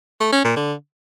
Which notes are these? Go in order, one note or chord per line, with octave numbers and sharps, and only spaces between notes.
A3
C#4
A#2
D3